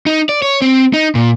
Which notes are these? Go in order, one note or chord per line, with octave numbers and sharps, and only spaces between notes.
D#4
D5
C#5
C4
D#4
A#2